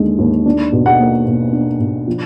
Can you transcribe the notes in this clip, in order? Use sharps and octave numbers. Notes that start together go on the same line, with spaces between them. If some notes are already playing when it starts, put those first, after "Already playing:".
Already playing: D#2 D3 G#3
D#2
D4
B2
F#5
A#3
B2
D4
B2
F3